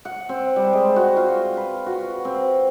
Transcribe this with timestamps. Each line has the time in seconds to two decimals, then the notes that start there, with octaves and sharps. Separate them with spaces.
0.05 F#5
0.29 C4
0.56 G3
0.73 G#3
0.96 F#4
1.17 F4
1.57 B4
1.86 F#4
2.25 C4